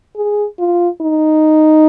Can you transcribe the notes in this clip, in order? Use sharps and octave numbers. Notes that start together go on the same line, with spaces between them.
G#4
F4
D#4